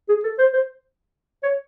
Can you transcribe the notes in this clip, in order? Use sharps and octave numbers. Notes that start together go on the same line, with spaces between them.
G#4
A4
C5
C5
C#5